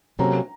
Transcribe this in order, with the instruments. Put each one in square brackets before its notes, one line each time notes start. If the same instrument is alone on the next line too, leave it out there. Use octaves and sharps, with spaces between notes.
[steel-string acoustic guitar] C3 F#3 A#3 C#4 A4 [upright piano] A#5